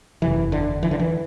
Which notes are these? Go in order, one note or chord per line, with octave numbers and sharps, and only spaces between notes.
F#1 E2 C3 E3
D3
E3
D3
E3